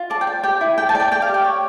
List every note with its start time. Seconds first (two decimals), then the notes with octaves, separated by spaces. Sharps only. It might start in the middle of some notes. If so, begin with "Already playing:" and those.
Already playing: F4
0.10 D5 A5
0.21 G5
0.27 D5
0.43 G4 G5
0.61 E4
0.78 D5 G5
0.89 A5
0.95 D5 G5
1.12 D5 G5
1.22 F5
1.29 G4
1.34 G5
1.44 C#5